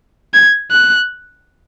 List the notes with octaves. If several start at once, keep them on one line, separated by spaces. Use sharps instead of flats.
G#6
F#6